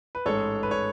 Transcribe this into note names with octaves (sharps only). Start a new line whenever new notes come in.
B4
A1 G#2 G#3 A4 C#5
B4
C#5